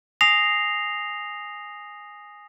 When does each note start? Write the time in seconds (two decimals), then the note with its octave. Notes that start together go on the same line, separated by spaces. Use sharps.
0.21 G#5 D#6 A#6 C7 F7